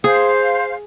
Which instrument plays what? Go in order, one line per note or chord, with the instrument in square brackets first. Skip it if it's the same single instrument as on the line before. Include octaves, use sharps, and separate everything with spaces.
[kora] G#4 [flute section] C5 F5